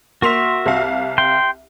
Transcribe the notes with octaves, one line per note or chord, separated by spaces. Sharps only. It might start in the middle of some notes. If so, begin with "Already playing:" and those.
A#3 F#4 E5 C6 F7
C2 F5
G5 C6